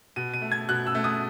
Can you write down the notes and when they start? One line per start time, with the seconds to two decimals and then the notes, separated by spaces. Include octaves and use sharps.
0.16 B2 D#7
0.34 D#7
0.42 A3
0.52 G#6
0.69 B2 F#6
0.87 E6
0.95 A3
1.04 D#6